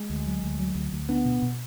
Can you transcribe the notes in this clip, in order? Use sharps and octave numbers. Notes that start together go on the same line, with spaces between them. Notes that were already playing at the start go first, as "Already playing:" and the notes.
Already playing: G#3
D2
F#3
D2
F#3
D2
D2
B3 D4
B2
B2